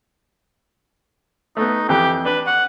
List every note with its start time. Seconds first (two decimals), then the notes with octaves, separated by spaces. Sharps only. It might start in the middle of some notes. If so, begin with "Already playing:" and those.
1.57 A3 B3 D#4
1.89 F2 E3 G4
2.25 D4 B4
2.47 F#5